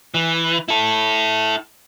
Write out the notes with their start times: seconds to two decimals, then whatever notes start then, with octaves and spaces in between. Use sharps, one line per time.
0.14 E3
0.68 E4 A4